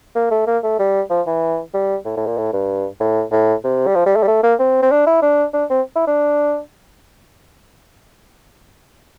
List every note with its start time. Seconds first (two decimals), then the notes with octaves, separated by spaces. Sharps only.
0.15 A#3
0.31 A3
0.47 A#3
0.64 A3
0.79 G3
1.10 F3
1.27 E3
1.74 G3
2.05 A2
2.17 A2
2.27 A#2
2.38 A2
2.53 G2
3.00 A2
3.32 A2
3.64 C3
3.87 G3
3.95 F3
4.06 G3
4.16 A3
4.23 G3
4.27 A3
4.43 A#3
4.59 C4
4.82 C4
4.91 D4
5.07 E4
5.22 D4
5.53 D4
5.70 C4
5.96 E4
6.07 D4